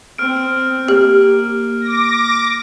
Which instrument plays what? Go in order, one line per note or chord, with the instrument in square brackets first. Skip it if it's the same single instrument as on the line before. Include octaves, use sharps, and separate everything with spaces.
[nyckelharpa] C4 [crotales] F6 D7
[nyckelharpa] A#3 [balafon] G4
[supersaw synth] D6 A#6